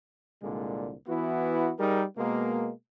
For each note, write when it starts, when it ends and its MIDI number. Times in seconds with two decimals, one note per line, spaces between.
0.42 0.93 36
0.42 0.93 46
0.42 0.93 50
0.42 0.93 56
1.08 1.71 52
1.08 1.71 59
1.08 1.71 64
1.08 1.71 66
1.78 2.03 55
1.78 2.03 63
1.78 2.03 68
1.78 2.03 70
2.17 2.70 47
2.17 2.70 56
2.17 2.70 58